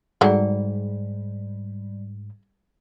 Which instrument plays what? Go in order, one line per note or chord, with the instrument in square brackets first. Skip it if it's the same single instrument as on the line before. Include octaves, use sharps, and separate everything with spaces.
[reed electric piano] G#2 [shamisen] F#3 A3 F#4 [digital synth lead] G3 [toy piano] G#4 D5 G5